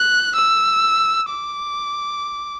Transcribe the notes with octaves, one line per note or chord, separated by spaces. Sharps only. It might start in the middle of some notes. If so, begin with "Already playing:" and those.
Already playing: F#6
E6
D6